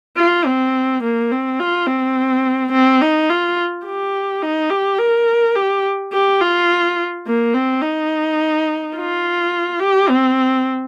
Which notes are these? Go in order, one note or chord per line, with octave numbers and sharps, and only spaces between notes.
F4
C4
A#3
C4
F4
C4
C4
D#4
F4
G4
D#4
G4
A#4
G4
G4
F4
A#3
C4
D#4
F4
G4
C4